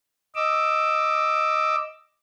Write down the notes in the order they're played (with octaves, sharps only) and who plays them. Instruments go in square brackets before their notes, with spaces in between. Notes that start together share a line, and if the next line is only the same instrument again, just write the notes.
[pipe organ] D#5 D6 E6